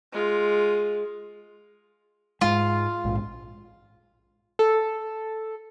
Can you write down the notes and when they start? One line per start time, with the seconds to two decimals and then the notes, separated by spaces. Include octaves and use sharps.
0.12 G#3 F4
2.41 G#2 G#3 F4
3.04 A#1 G#2
4.59 A4